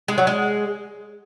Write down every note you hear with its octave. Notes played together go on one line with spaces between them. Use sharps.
G#3
F#3
G#3